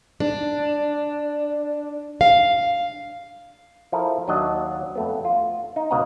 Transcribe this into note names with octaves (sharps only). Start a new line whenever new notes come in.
D4
F5
F3 E4 A4 A#4
D#2 F#3 D4 D#5 F#5
F2 A3 B3
F4
D#4
C#2 B2 D#5 F5 F#5 A#5